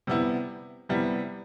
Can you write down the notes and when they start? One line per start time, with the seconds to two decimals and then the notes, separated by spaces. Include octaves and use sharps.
0.07 C3 G3 B3 E4
0.89 C3 G3 B3 E4